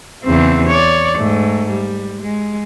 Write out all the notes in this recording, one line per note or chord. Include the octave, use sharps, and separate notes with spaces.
E2 C#3 C4
C#5 D5
G#2 A3
G3
G#3